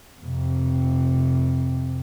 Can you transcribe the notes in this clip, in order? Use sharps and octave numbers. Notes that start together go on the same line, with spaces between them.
F2 C3